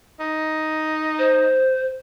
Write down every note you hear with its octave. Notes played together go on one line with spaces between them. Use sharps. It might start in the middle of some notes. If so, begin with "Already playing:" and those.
D#4
C5